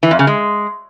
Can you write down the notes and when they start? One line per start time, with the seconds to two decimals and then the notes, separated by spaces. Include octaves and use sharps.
0.03 E3
0.11 F2
0.19 C#3
0.27 G#3